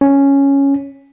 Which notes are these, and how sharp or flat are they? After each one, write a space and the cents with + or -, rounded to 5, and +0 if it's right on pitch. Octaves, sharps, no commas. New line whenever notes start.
C#4 +0